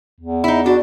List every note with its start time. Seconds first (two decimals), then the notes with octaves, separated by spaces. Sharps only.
0.20 E2
0.44 D#4 E4
0.66 D4 F#4